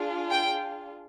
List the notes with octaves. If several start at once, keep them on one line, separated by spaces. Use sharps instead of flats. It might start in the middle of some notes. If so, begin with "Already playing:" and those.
Already playing: D4 F4 G#4
G5